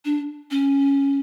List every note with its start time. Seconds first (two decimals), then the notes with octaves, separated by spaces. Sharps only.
0.05 D4
0.51 C#4